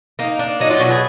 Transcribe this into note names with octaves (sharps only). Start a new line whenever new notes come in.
A#3 D#4
D4
F#3 D#4
F4
B2 F#4
G#4